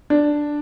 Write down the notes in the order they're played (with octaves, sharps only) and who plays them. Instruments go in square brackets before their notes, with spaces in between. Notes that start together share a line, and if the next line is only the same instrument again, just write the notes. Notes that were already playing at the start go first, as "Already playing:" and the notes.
[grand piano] D4